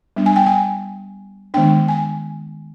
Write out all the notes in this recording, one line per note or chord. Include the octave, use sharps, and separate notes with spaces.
G3 B3 D4
G#5
G5
G#5
D#3 G#3 B3 D4 G5
G#5